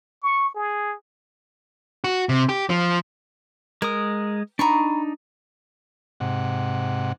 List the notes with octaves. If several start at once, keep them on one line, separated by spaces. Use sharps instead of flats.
C#6
G#4
F#4
C3
G4
F3
G#3 A#4 D#6
D4 D#4 A#5 B5 C#6
G#2 C3 F#5